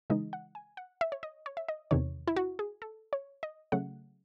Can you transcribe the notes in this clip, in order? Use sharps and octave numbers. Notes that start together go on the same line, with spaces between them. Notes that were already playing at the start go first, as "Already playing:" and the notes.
C#3 E3 G#3 D#4 D#5
F#5
G#5
F#5
E5
C#5
D#5
C#5
E5
D#5
E2 C3 D#3 C#5
E4
F#4
G#4
A4
C#5
D#5
C#3 F#3 A3 F#5